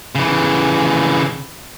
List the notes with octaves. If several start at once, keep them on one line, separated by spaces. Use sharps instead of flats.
C#3 E3